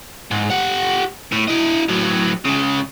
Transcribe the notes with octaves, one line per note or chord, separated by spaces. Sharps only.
G#2
G4 F#5
A2
E4 D#5
A2 F#3
C#2 C#3